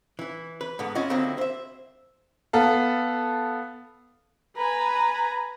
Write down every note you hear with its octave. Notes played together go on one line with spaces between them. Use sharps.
E3 E4
B4
G#2 D3 B3
C#4 E4 F4 D#5 F#5
D3 D#3 F#3 A#3 C4 E4
C5 E5
B3 A4 F5
B4 G#5 A#5